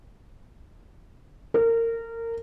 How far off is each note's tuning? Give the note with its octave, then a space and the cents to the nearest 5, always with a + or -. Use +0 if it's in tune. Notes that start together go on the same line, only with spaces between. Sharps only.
A#4 -25